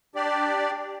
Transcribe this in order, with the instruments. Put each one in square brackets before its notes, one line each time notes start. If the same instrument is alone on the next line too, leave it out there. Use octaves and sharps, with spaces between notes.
[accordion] D4 G4 D5